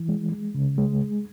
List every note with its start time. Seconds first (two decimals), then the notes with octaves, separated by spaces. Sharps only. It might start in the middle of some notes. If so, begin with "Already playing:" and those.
Already playing: E3
0.09 G#3
0.32 G#3
0.54 C#3
0.78 G#3